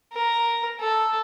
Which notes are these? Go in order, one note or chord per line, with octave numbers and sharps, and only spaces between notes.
A#4
A4